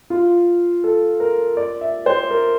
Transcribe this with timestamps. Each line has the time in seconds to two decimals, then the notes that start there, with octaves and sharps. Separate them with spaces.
0.10 F4
0.84 A4
1.20 A#4
1.57 D5
1.81 E5
2.06 C5
2.30 A#4